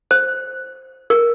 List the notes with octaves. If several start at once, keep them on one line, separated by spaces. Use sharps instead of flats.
C5
A#4